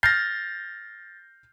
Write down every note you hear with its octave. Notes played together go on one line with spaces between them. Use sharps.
F6 G6 A6 A#6 C7